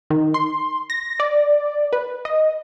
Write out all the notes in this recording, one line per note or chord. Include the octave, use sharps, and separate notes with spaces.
D#3
C6
A#6
D5
B4
D#5